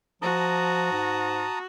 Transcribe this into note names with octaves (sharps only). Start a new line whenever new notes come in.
F3 F#4 A5 A#5 D#6
G#2